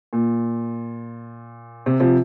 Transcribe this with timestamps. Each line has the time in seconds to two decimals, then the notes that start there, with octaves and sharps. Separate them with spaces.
0.13 A#2
1.86 C3
2.00 C3 F3